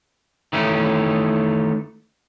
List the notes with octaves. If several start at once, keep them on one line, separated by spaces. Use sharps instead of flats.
D#3 E3 A3 C#4